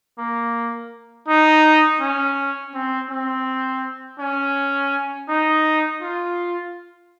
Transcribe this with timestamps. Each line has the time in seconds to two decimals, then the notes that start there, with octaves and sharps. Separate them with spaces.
0.18 A#3
1.28 D#4
2.01 C#4
2.74 C4
3.10 C4
4.19 C#4
5.29 D#4
6.02 F4